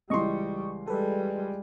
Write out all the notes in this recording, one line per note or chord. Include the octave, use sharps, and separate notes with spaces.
C#2 E3 G3 D#5 C6 C#6
G3 G#3 A4 B4